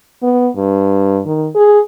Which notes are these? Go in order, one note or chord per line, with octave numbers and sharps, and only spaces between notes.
B3
G2
D#3
G#4